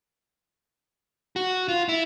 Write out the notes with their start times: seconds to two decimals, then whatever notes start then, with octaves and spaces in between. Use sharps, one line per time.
1.36 F#4
1.68 F4
1.89 E4